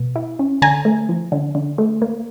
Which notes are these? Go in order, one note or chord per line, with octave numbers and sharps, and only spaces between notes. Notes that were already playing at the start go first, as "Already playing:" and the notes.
Already playing: B2
E4
C#4
D3 G#5 A#5
A3
F3
D3
D3
A3
A#3